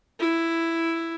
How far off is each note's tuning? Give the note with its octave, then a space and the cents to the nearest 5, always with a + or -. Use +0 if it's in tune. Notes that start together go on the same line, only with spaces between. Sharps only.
E4 +5